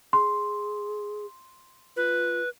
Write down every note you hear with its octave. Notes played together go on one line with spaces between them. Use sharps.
G#4 C6
F4 B4